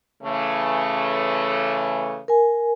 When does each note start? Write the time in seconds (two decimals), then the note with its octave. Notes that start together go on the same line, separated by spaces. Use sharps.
0.23 C#3 E3 A3
2.28 A#4 G#5